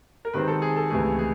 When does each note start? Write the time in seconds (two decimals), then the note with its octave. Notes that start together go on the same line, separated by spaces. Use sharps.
0.25 A#4
0.34 C3 D#3 G#3 C4 B4
0.48 A4
0.62 G#4
0.76 A4
0.90 C#2 C3 E3 A3 G#4
1.19 G#4